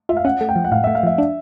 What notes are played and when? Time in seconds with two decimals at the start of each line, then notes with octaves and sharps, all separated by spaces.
0.09 F4 E5
0.17 F5
0.25 C#4 F#5
0.41 A3
0.49 G5
0.56 F3
0.65 F#5
0.72 A2 F5
0.84 E5
0.87 A3
0.95 F5
1.03 F3 E5
1.18 D4